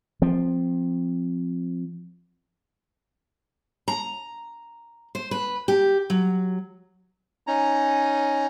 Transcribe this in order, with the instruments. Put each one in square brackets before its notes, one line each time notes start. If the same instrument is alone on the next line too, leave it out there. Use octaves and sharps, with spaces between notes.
[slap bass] F3 C4
[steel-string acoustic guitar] A#5
C5
B4
G4
F#3
[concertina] C#4 D#4 A#5